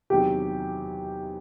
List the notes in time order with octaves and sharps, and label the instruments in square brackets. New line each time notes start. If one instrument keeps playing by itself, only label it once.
[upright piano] E2 C3 D#3 F#3 [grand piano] G4